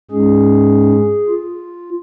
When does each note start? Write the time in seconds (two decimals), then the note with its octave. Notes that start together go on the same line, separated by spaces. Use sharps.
0.11 G#2 G#3 C#4 G#4
1.28 F4